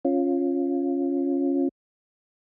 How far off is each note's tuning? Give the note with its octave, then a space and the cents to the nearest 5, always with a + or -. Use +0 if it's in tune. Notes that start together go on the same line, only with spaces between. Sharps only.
C#4 -10 F4 +5